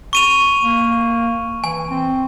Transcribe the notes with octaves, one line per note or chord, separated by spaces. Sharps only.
C#6 D#7 F7
A#3
E3 G#5
C4